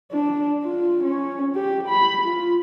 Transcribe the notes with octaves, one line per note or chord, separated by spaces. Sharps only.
D4
F4
C#4
G4
B5
F4